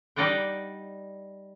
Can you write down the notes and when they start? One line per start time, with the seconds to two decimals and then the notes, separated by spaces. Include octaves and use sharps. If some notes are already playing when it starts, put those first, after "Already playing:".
0.16 G3 D#4 D5 D#5 F#5 G5